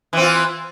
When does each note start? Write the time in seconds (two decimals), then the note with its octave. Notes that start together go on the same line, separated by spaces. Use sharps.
0.13 E3
0.17 C4
0.22 F4